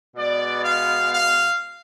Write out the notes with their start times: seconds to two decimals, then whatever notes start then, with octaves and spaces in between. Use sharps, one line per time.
0.16 B2 G#3 B3 D5
0.64 F5
1.11 F5